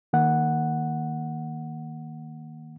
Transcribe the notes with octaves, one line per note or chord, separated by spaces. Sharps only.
D#3 A#3 F#5